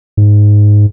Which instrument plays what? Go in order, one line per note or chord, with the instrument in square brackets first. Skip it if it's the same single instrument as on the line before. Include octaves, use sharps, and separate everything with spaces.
[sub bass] G#2